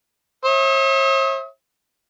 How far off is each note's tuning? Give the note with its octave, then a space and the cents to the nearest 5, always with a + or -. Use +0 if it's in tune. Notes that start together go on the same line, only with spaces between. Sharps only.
C#5 -45 E5 -10 D#6 +35